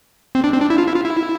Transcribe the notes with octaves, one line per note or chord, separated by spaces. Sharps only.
C4
D4
C4
D4
E4
F4
E4
F4
E4